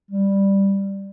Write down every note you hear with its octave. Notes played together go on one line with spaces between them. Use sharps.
G3